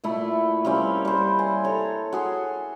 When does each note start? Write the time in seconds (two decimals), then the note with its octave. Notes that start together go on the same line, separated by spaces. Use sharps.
0.04 A#2 A3 E4
0.65 G3 A#3 C4 C#4
1.05 G3 C5
1.39 G#5
1.64 A4 C#5 A#5
2.12 F#4 G#4 C6